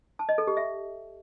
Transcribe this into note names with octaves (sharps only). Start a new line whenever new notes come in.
A5
D#5
A4
G4
E5